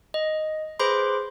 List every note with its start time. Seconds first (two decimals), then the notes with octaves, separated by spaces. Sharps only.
0.14 D#5
0.79 G#4 B4 C5 B5 C6 D6